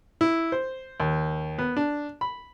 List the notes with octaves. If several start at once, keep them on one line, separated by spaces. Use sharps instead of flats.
E4
C5
D#2
B3
D4
B5